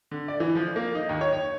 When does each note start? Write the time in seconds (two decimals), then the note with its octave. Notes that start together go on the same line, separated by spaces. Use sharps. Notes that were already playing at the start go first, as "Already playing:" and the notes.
0.11 D3
0.28 D5
0.40 E3
0.55 F3
0.76 A#3
0.95 D#4
1.09 D#2
1.21 C#5
1.33 C#5